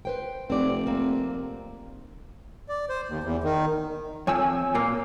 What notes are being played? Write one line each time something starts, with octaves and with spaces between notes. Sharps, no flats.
B4 C5 G5
F1 C4 D5
A#3 C4
D5
C5
D#2
E2
D#3
F2 F3 C#5 G#5 E6
A#2 A#3